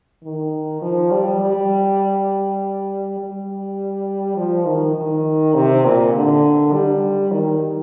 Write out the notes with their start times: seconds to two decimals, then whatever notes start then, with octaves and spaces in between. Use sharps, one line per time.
0.23 D#3
0.82 F3
1.11 G3
1.40 G3
3.19 G3
4.37 F3
4.65 D#3
4.96 D#3
5.55 C3
5.85 A#2
6.14 D3
6.73 G3
7.32 D#3